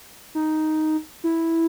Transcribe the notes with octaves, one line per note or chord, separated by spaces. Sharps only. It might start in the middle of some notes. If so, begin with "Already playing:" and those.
D#4
E4